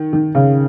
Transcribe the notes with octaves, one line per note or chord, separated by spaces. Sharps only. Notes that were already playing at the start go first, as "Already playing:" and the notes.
Already playing: D#3
D#3
C#3